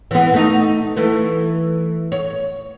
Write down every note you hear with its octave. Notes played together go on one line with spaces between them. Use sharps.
E3 B3
A3 D#4
E3 A3
C#5